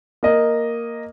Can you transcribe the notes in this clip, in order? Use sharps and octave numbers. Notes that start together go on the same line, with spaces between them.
A#3 D#5